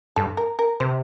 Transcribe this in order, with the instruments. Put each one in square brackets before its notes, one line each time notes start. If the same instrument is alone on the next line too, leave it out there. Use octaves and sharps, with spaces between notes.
[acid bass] G2 [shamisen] A4
[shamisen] A#4
A#4
[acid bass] C3 [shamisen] C5